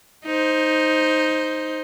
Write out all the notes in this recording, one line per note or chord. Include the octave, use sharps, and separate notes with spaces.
D#4 C5